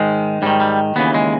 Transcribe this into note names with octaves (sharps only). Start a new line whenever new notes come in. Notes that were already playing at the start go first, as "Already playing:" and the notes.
Already playing: G#2 D#3 G#3
G#2 D#3 G3
G3
D#2 C#3 E3 B3
G#3